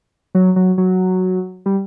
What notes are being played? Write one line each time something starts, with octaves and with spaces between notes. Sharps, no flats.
F#3
F#3
F#3
G3